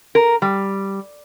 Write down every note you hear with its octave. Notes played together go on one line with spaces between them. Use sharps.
A#4
G3